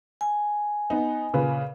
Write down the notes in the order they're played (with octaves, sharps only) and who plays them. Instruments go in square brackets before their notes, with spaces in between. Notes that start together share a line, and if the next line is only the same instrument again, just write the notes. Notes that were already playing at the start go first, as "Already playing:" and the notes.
[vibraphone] G#5
[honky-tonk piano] B3 D#4
A#2 C#3 B4